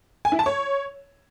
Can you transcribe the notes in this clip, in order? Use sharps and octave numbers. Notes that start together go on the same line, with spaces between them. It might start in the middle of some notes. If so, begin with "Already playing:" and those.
G#5
E4
A5
C#5